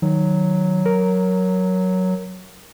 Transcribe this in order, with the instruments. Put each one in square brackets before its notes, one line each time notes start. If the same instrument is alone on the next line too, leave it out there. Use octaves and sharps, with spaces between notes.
[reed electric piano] D#3 [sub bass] F#3
[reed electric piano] A#4